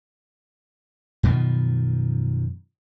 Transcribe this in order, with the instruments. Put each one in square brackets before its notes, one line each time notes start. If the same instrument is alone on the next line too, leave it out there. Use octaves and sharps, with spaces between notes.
[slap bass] F#2 B2 D#3 F3